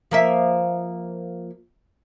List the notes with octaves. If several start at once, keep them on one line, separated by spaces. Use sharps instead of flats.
F3 A#3 E5